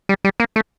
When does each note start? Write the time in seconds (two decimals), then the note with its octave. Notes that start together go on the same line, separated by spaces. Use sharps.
0.09 G3
0.24 G3
0.40 A#3
0.56 A3